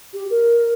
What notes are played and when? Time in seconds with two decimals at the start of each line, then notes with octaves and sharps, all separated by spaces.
0.13 G4
0.30 A#4